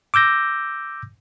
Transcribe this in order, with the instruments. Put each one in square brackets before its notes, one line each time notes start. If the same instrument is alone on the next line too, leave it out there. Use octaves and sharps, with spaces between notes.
[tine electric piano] D6 E6 G6 A#6